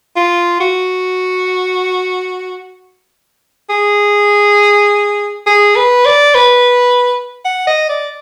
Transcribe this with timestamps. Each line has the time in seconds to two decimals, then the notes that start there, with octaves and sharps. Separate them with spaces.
0.16 F4
0.60 F#4
3.70 G#4
5.47 G#4
5.76 B4
6.05 D5
6.35 B4
7.45 F#5
7.67 D#5
7.89 D5